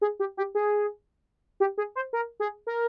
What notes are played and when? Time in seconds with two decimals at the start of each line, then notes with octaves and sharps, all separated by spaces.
0.01 G#4
0.20 G4
0.37 G4
0.55 G#4
1.60 G4
1.78 G#4
1.95 C5
2.13 A#4
2.40 G#4
2.67 A#4